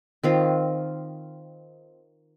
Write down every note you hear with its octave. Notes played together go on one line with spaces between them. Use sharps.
D#3 C4 F4